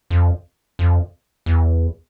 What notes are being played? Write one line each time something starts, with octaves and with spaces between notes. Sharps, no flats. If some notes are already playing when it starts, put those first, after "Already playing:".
F2
F2
E2